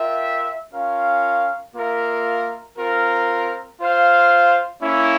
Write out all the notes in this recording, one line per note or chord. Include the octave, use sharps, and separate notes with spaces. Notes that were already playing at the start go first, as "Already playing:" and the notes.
Already playing: F4 A#4 E5 G5
C#4 F4 A#4 F5
A#3 F4 A#4 E5
C4 F4 A#4
F4 C5 F5
A#3 C#4 E4